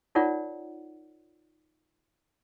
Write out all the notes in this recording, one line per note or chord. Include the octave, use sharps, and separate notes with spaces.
D#4 F4 A#4 C#5 D5 F#5